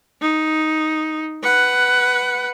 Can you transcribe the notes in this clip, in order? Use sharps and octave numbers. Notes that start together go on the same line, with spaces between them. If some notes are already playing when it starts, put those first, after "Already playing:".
D#4
B4 F#5